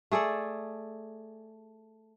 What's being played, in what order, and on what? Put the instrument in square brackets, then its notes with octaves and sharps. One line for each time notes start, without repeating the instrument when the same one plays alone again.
[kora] A3 G#4 A4 D5